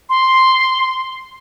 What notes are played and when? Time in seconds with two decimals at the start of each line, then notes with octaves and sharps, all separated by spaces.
0.09 C6